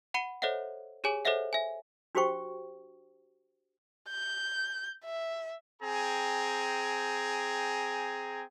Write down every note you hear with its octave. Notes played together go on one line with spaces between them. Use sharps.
F#5 B5 C#7 D#7 G7
A4 C5 C#5 D#5 E5 F#5
G4 G#4 C#5 G#5 D6 F#7
A4 C5 C#5 D#5 E5 F#5
E5 G#5
D4 F#4 G4 C5 G5 C#6
G6
E5
C4 G#4 G5 G#5 A#5